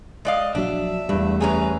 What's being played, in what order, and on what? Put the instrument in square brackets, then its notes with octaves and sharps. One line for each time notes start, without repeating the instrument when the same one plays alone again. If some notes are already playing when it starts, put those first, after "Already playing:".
[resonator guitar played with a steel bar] G#3 D5 F5 [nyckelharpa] D#5
[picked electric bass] A#1 F#3 [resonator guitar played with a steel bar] D4 [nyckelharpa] E5
[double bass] E2 A3 [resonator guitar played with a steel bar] G2 [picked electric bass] G3
[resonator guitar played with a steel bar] F#2 C#4 G#4 [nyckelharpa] B4 A#5